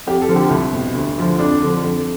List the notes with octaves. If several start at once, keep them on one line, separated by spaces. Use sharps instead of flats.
F2 G4
A4
D3 F3
G4
C2
B2
D2
D3 F3
F2 D4
D3 F3
F2